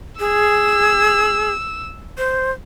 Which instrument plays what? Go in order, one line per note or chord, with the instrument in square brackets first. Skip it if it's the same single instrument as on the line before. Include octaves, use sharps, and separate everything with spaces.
[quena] G#4 [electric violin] E6
[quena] C5